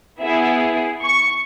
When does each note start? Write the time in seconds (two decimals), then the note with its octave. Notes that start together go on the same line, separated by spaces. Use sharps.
0.21 B3 E4 G#4 E5
1.03 C#6